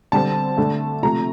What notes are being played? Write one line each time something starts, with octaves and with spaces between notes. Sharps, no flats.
D3 G3 C4 A5
D3 A3 D4
C3 F3 A3 A#5